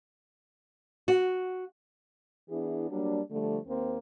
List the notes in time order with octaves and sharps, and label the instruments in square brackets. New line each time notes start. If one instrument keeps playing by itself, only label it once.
[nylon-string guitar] F#4
[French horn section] E3 B3 D4 E4 G#4
F#3 G3 A#3 D4
D3 F3 G3 A3
D#2 A#3 C4